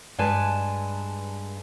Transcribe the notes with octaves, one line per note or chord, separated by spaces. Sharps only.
G2 G#3 B4 G#5 A5